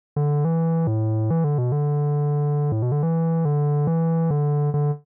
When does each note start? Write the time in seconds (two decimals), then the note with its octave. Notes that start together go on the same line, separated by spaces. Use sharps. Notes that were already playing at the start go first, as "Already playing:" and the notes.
0.16 D3
0.45 E3
0.87 A2
1.31 E3
1.44 D3
1.58 B2
1.72 D3
2.72 A2
2.82 B2
2.92 D3
3.03 E3
3.45 D3
3.87 E3
4.31 D3
4.74 D3